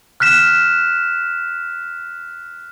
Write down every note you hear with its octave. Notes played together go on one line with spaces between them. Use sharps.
F6 F#6 B6 E7